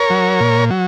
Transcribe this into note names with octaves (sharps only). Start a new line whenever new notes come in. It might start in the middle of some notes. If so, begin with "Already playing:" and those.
Already playing: A#4 C#5
F#3
A#2
F#3